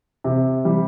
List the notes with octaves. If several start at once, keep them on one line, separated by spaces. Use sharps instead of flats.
C3
G3